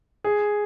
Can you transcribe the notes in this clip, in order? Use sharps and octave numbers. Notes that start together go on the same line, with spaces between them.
G#4